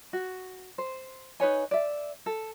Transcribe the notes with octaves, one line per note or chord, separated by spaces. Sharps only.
F#4
C5
D#4 B4 C#5 G#5
D5 E5
A4